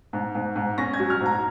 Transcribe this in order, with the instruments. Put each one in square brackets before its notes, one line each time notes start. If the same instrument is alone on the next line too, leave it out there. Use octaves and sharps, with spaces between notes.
[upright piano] G#2
G#2
G#2
C#4 A#6
G#6
F#3
F6
G#2
A#5